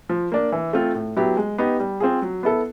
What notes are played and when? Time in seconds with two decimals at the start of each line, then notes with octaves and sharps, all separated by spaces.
0.09 F3
0.32 A#3 D4
0.52 E3
0.73 A3 C4 F4
0.95 A2
1.17 F#3 B3 E4 G4
1.37 G#3
1.58 B3 D#4 G4
1.80 G3
2.00 C4 F4 G#4
2.22 F#3
2.43 B3 E4 A4